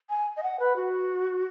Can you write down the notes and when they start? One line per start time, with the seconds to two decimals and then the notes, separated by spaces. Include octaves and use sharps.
0.10 G#5
0.37 D#5
0.43 F#5
0.60 B4
0.76 F#4